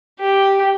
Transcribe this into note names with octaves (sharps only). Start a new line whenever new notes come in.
G4